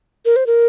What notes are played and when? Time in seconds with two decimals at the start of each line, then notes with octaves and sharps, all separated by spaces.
0.25 A#4
0.36 C5
0.47 A#4